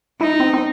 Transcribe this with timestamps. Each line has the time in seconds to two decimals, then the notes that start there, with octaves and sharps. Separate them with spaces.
0.20 D#4 E4
0.40 C4
0.53 C4